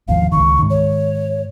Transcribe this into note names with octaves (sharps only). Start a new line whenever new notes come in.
G#1 D#2 F3 F5
C#2 D#3 C#6
G#2 D#3
C#5